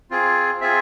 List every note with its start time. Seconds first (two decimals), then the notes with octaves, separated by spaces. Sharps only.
0.11 C4 F4 G#4
0.61 C4 F4 G#4 E5